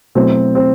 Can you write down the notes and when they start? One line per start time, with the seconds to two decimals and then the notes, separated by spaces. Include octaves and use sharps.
0.15 B2 F#3 A3 C4 E4
0.55 C4